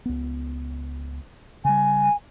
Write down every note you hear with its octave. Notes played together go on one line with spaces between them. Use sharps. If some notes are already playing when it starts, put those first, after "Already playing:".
C#2 B3
C#3 G3 G#5